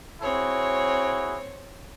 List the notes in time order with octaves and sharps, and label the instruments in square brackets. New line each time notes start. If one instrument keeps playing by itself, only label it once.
[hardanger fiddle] C4 C#5 [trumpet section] E4 F#4 G#4